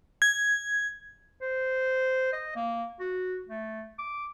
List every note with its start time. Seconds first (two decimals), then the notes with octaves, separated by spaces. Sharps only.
0.22 G#6
1.41 C5
2.33 D#5
2.56 A#3
3.00 F#4
3.49 A3
3.99 D6